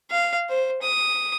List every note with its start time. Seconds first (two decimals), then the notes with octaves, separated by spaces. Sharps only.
0.11 F5
0.50 C5
0.82 D#6